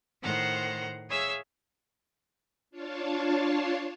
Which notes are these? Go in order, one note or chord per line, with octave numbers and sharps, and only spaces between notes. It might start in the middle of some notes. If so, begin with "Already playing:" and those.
A2 D#3 C5 F#5 A#5 C6
G#4 C#5 E5 F5 E6
D4 F4 C#5 F5 A5